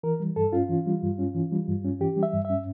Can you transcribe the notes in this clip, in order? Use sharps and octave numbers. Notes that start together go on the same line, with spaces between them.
E3 A#4
G3
G2 A4
C#4 F4
E3
G3
G2
C#4
E3
G3
G2
C#4
E3 G4
G3
E5
G2
E5
C#4